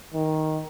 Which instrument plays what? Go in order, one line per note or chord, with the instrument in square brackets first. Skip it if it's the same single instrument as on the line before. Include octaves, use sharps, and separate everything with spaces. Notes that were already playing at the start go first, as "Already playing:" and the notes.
[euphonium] D#3